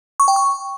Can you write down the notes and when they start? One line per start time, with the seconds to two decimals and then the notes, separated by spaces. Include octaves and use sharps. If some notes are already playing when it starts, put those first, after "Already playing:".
0.20 C#6
0.28 G5
0.36 C#6